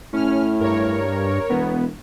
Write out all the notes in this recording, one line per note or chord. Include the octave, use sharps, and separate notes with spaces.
A2 C#4 F6
G2 A#4 C#5
E1 B3